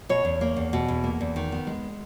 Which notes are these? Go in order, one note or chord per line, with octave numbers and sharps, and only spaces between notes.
B2 C#5
E2
A#3
E2
B2
E2
A#3
E2
D#3
B3
G#3